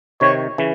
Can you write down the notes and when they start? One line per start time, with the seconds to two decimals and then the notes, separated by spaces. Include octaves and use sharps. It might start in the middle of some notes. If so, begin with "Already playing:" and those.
0.21 C3 D#3 C#5
0.58 C#3 E3